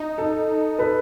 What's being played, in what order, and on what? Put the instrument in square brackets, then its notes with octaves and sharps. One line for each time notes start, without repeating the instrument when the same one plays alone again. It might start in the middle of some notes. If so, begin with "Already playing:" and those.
Already playing: [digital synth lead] D#4
[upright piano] A4
A4 B4